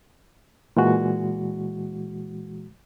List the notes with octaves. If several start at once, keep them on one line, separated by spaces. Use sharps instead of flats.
A#2 E3 G#3 F#4